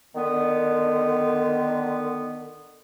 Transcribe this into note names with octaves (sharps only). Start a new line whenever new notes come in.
D3 D#3 B3